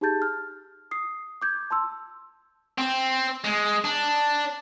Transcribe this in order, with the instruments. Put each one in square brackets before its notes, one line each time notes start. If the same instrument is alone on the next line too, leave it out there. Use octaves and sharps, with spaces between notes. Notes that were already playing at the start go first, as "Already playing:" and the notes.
[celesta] D#4 G4 G#4 A5 G6 A6
F6
D#6 C7
D6 G6 G#6
A5 C6 E6
[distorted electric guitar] C4
G#3
D4